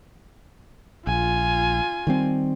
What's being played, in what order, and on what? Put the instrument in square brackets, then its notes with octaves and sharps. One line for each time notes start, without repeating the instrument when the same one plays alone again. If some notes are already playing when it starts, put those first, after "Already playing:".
[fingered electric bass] A#1 [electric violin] F4 G#5
[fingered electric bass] D#3 G3 C4